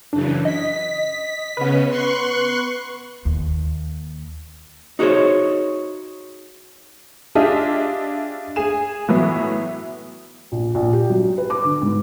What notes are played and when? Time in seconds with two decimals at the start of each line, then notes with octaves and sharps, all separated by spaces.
0.13 F#2 C#3 E3 D4
0.45 D#5 B6
1.57 C#3 B3 C#4 B4
1.89 C6 C#6 F#6
3.25 D#2
4.99 D#4 F#4 G#4 C5 C#5
7.35 D4 F4 G4 G#4 D#5 E5
8.56 G#4 G#5 E7
9.08 A2 E3 F#3 B3 E4
10.52 A#1
10.75 A#1
10.93 G4
11.10 F#3
11.38 B4
11.50 D6
11.65 D3
11.82 G#2